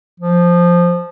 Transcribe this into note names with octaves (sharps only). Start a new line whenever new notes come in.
F3